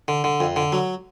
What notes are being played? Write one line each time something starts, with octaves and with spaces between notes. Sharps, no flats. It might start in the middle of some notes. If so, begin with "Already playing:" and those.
D3
D3
F2
D3
F#3